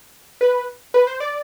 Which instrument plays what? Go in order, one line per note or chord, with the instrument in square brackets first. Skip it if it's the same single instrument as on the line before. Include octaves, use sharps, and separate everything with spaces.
[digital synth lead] B4
B4
C5
D5